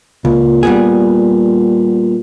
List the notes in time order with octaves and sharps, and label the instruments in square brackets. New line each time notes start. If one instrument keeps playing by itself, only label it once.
[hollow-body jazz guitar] C#2 [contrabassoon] A#2
[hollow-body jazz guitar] G3 B3 G#4